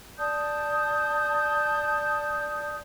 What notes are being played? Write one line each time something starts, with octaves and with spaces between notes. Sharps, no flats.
D5 A5 D#6 G6